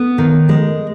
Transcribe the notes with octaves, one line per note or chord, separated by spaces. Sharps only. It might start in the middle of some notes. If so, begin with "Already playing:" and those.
Already playing: B3
D#3
G#3